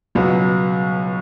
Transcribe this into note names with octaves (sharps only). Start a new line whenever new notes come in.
C#2 B2 F#3 B3